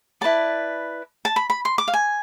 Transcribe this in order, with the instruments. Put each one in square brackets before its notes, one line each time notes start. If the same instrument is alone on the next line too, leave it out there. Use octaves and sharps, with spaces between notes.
[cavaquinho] E4 B4 D5 A5
A5
B5
B5
C6
D6
F5
G#5